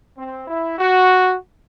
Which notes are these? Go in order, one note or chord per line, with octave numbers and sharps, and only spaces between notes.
C4
E4
F#4